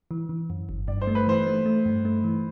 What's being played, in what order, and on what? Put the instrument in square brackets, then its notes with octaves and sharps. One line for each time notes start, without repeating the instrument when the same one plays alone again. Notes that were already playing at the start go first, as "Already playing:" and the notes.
[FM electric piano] E3
E3
F#2
G1
[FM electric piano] G2 [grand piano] D5
[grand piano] C5
[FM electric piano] A3
[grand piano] B4
[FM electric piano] E3 [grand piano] C5
[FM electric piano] A3
A3
G2
A3
E3